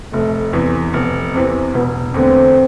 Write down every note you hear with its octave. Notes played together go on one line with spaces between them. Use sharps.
F1 A3
E2 C3 E3
F1 B3
E2 C3 E3 C4
E1 B3
E2 D3 A3 C4